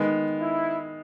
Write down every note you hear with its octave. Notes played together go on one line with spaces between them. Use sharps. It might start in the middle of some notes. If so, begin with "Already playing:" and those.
Already playing: D#3 G#3 B3
E4